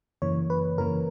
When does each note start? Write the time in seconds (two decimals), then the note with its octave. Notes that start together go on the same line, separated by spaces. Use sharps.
0.22 F#2 C#3 E3 A#3 C#5
0.50 B4
0.78 F#2 C#3 E3 A#3 A#4